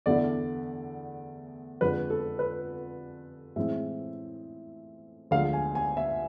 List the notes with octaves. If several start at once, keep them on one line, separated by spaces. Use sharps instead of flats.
E2 D3 A3 E4 D5
F2 D3 G#3 B4
A4
B4
A2 E3 G#3 C4 E5
D2 D3 F3 G#3 F5
G#5
G#5
E5